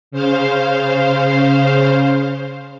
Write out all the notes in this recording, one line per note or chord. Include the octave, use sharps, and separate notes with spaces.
C#3 C5 F5